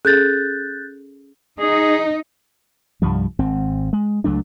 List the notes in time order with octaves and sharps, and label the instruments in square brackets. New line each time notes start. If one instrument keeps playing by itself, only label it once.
[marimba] C#4 G#4 A4 [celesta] F#6 G6 A6
[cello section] D#4 [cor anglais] G#4
[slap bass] C2 G2 F3 G3
G#1 C4
G#3
C#2 F#3 A3 D4